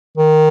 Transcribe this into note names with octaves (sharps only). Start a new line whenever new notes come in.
D#3